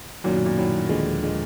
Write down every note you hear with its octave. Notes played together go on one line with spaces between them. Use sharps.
F#2 A#2 D#3 F#3
B2
A#2
F#2 A2 D#3 F#3
D#2 D3 F3 G#3
D3 F3 G#3